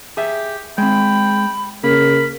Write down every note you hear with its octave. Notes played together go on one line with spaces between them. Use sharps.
G4 G#4 E5
G#3 C4 G5 B5
C#3 A#3 A#4 B5